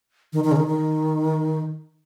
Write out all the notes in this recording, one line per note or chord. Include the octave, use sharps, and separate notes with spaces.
D#3
D#3
C#3
D#3
D#3